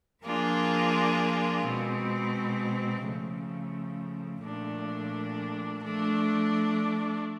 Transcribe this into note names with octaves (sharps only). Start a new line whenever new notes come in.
F3 A#3 D4 F4 G#4
B2 G#3 C4
C#3 F3 A3
A#2 F3 A3 D4
F3 A3 D4